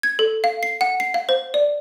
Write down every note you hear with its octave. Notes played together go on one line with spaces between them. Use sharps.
G#6
A4
F5
C7
F#5
C7
F5
C5
D5